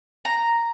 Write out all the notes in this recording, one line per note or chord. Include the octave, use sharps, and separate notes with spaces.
A#5